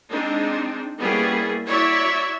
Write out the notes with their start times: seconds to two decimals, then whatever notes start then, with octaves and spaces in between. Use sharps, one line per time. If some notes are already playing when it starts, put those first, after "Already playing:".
0.11 G#3 C4 D4 D#4
0.99 G3 A#3 B3 C#4 E4 G#4
1.69 E4 F#4 C#5 D5 E5